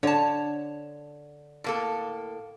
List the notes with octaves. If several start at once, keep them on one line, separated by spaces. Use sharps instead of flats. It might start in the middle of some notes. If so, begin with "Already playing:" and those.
D3 C#5 A5
A2 A#3 A4